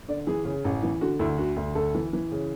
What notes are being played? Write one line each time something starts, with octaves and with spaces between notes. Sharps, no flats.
D3 D5
E3 G#4
C#3
A1
E3
D3 F#4
D2 E4
D3 F#4
D2
D2 A4
E3
E3
C#3